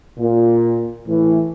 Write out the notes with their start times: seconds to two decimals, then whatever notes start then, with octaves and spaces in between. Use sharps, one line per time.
0.18 A#2
1.07 A2 E3